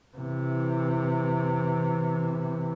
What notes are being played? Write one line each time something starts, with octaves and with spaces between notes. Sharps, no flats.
C3 E3